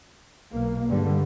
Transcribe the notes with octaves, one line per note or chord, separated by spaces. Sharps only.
B1 B2 A#3
C#2 G2 D3 G3